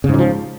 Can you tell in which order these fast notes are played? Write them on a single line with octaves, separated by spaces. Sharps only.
C#3 G#2 F#3 F3